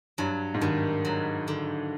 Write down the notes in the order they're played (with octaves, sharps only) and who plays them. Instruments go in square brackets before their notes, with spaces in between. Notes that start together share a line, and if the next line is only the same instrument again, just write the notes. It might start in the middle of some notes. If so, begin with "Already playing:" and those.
[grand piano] G2 [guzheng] F#3
[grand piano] G#2
[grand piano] G2 [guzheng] D#3
[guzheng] F#3
D3